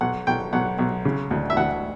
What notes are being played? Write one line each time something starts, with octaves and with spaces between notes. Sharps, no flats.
B1 F#5
B1 G5
B1 F#5
B1
C#3
D2
E5
D2 F#5